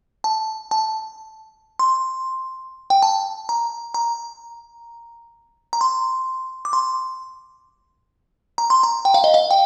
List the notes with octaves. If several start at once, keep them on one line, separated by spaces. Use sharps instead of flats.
A5
A5
C6
G5
A5
A#5
A#5
A#5
C6
D6
C6
A#5
C6
A#5
G5
F5
D#5
F5
G5